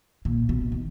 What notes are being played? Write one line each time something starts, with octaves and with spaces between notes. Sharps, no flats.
A#2
B2
D#3